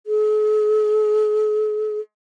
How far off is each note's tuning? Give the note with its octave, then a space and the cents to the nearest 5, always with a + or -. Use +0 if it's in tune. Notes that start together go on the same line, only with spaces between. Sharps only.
G#4 +45